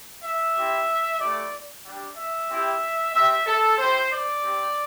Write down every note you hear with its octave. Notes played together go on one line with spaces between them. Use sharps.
E5
C4 E4 G4
A3 E4 G4 D5
G3 D4 G4
E5
C4 E4 G4
C4 G4 E5
A4
C4 E4 G4 C5
D5
C4 G4